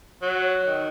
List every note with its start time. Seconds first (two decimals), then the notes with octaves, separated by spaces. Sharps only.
0.22 F#3
0.67 D#3